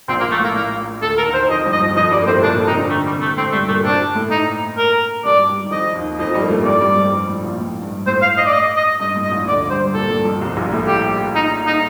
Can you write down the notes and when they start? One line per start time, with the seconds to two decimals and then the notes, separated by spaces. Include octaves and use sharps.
0.08 A#1 A#2 C4
0.20 A#3
0.31 A3
0.39 A2
0.43 A#3
0.55 A2 A#3
1.02 D2 D3 A4
1.17 A#4
1.26 D#2 D#3
1.34 C5
1.42 D#3
1.49 F2 F3 D#5
1.65 G2 G3
1.72 D#5
1.80 F2 F3
1.96 F2 F3 D#5
2.11 G2 G3 D5
2.22 A#3
2.27 A2 A3 C5
2.42 A#2 A#3 D4
2.54 A#2 A#3
2.66 C3 C4 D#4
2.78 D3 D4
2.89 D3 A3 D4
3.06 G3
3.13 C3 C4
3.21 A3
3.36 A2 A3 C4
3.52 G2 G3 A3
3.68 A#2 A3 A#3
3.83 C3 C4 D4
4.15 A2 A3
4.31 D#4
4.77 A#4
5.24 G2 G3 D5
5.47 G2 G3
5.65 D#3
5.71 F2 F3 D#5
5.95 D#2 D#3
6.19 F2 F3 D#5
6.34 G2 G3
6.42 A#3
6.50 A2 A3
6.65 G2 G3 D5
6.81 G2 G3
6.96 F2 F3
7.12 G2
7.28 A2
7.44 A#1 A#2
7.60 A2
7.82 G2
8.06 A2 C5
8.21 F5
8.37 D#5
8.46 D5
8.53 D#5
8.76 D#5
9.00 G2 D#5
9.16 A2
9.24 D#5
9.31 A#1 A#2
9.47 D2 D3 D5
9.70 G2 G3 C5
9.94 A#2 A#3 A4
10.09 G2 G3
10.25 F2 F3
10.41 C2 C3
10.57 A#1 A#2
10.72 A2 A3
10.87 G4
11.35 D#4
11.67 D#4